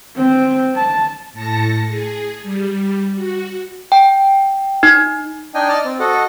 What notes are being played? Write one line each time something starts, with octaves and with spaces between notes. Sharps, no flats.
C4
A5
A2 A5 A6 A#6 C#7
G#4
G3
F#4
G5
D#4
D4 D#4 D#5 G5 G#5
D5 D#5 A5 F6
C4
F#4 A4 D#5 F#5